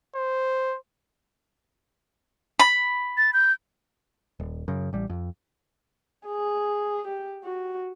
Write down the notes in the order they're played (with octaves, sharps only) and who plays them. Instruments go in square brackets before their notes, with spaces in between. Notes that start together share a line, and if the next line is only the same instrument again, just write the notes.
[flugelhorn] C5
[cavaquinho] B5
[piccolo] A6
G6
[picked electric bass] D#1
F#2 C#3
A1 G3
F2
[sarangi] G#4
G4
F#4